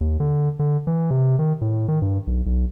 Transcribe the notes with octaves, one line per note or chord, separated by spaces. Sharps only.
D#2
D3
D3
E3
C3
D#3
A2
D#3
G2
B1
B1